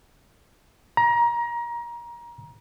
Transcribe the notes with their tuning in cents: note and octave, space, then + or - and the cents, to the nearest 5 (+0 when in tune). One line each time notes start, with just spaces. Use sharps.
A#5 +25